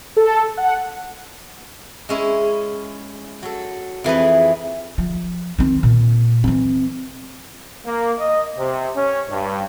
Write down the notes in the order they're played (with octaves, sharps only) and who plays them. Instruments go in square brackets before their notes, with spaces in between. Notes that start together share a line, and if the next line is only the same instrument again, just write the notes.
[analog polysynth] A4
F#5
[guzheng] G#3 C#4 E4
F#3 A4
F2 E3 G#4 B4
[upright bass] F3
D#3 C4
A#2
E3 C4
[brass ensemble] A#3
D#5
C3
C#4
G2